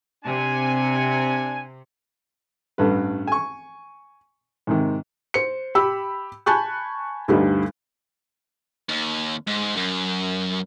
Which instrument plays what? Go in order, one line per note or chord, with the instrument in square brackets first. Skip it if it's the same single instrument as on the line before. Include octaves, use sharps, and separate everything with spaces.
[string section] C3 [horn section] D4 G#5
[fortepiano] A1 G2 A3 B4
G#5 C#6
G#2 C3 D#3
[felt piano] C5 C#7
G4 B5 E6
G#5 A5 B5 C#6 F#6 G6
D2 G2 D3 G3 D#4
[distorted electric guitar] D#2
G#2
F#2